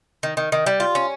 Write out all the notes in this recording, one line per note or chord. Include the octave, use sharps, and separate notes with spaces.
D#3
D#3
D#3
G3
F4
C#4